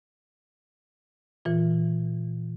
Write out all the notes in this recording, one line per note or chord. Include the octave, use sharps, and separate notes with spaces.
A#2 E3 F4